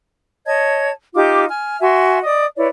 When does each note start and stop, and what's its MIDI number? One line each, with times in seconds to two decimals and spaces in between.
0.46 0.90 73
0.46 0.90 75
0.46 0.90 81
0.46 0.90 92
1.14 1.45 63
1.14 1.45 65
1.14 1.45 67
1.14 1.45 86
1.49 1.78 80
1.49 1.78 89
1.80 2.18 66
1.80 2.18 76
1.80 2.18 80
1.80 2.18 84
2.23 2.45 74
2.23 2.45 75
2.23 2.45 87
2.57 2.67 64
2.57 2.67 71
2.57 2.67 73
2.57 2.67 74